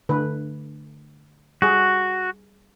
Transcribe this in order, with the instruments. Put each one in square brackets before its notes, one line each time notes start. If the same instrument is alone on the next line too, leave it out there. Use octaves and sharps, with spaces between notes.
[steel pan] D3 A3 B4
[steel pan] G3 G#4 [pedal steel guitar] F#4